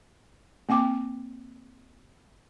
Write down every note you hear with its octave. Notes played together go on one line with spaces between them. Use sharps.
A#3 C4 G5 D6